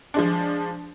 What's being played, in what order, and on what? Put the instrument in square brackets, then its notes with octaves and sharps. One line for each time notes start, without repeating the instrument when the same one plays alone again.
[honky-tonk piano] F3 G#3 D4